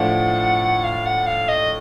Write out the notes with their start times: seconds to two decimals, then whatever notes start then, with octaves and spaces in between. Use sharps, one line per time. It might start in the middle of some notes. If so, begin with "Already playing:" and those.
Already playing: A2 F3 A3 D4 F4 F#5
0.84 F5
1.06 F#5
1.27 F5
1.49 D#5